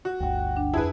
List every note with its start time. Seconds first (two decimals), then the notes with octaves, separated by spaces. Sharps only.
0.05 F#4
0.20 G1 D2 F#5 G5
0.57 D4
0.74 F2 E4 G#4 B4 A5 G#6